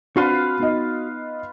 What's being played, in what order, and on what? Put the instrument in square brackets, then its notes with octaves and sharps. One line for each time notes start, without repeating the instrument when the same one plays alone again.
[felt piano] C4 D4 [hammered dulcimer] F4 B4 F5 [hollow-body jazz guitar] F#4 C6
[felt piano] B3 D#4 D#5